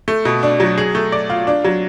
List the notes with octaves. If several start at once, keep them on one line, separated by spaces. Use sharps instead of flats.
A3
B2
D4
F#3
G#4
A3
D5
F4
D4
F#3